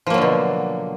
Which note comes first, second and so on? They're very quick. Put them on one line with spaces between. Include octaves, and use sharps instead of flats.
F3 A#3 F#3 D3 B2